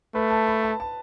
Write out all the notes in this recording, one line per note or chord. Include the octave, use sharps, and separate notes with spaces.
A3 B4
A5
B5
A5
A5